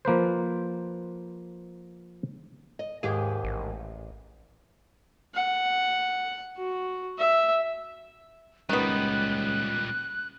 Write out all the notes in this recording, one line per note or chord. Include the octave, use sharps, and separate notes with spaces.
F3 A#3 B4 C5
D#5
D#2 G#2 G4 G#4
A1
F#5
F#4
E5
C#2 A#2 D#3 G3 B3 F#6